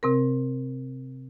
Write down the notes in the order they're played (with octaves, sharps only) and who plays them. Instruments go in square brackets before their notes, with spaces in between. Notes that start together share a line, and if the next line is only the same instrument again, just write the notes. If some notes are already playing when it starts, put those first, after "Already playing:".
[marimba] C3 C4 A#4